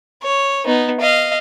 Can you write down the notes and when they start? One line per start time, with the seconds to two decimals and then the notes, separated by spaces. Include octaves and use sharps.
0.23 C#5
0.66 B3 D#4
1.01 D#5 F5